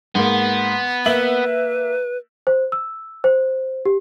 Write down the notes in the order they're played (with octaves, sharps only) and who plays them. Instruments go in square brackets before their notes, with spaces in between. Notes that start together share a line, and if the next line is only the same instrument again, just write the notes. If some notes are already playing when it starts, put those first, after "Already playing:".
[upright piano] G#2 A#3 [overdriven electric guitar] B3
[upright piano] A#3 E5 F#7 [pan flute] B4
[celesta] C5
E6
C5
G4